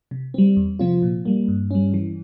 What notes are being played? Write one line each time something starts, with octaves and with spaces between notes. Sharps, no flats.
C3
G3 C4
E2
C3 F3 C4 F4
A#2
G3 A#3
G2
G3 C#4
E3